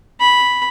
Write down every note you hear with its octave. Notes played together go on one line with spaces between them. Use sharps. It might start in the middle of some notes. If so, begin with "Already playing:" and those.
B5